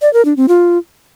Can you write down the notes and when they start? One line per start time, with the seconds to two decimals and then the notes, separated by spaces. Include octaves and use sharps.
0.02 D5
0.13 A#4
0.25 D4
0.37 C4
0.48 F4